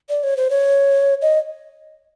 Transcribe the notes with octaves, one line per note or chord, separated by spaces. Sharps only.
D5
C#5
C5
C#5
D#5